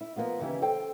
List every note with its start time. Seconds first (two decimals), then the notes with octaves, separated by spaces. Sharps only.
0.01 E4
0.16 F3 A#3 B3 F4
0.39 D#2 C#3 E3 E4 G4
0.62 A4 C5 G5